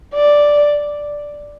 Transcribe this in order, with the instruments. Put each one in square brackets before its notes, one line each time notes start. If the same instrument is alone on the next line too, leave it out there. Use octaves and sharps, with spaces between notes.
[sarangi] D5